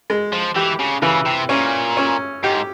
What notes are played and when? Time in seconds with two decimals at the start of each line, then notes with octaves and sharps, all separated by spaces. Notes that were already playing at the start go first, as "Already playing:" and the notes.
0.10 G#3
0.33 F3
0.56 E3 G4
0.80 C#3
1.02 C#3 E3
1.26 C3
1.49 A#2 C#4
1.97 C#4
2.43 G#2 G4